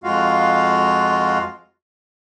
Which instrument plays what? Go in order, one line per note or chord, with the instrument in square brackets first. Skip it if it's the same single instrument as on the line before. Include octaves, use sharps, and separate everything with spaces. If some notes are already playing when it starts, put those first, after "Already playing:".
[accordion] F2 G#3 F4 F#4 F5